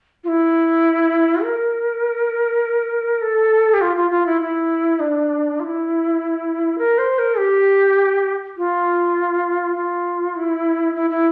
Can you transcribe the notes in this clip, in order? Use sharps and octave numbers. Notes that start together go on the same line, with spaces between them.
F4
E4
A#4
A4
G4
F4
F4
F4
E4
E4
D4
F4
E4
A#4
C5
A#4
G4
F4
F4
E4
E4
E4